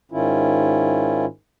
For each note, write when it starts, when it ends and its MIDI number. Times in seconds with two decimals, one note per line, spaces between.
0.12 1.25 44
0.12 1.25 51
0.12 1.25 61
0.12 1.25 64
0.12 1.25 65